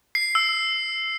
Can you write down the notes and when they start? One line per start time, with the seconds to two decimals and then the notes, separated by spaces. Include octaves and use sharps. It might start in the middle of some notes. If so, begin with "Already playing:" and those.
0.15 C7
0.35 E6